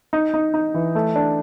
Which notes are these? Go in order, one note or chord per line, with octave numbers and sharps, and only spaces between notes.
D#4
D#4
D#4
E3
A3
D4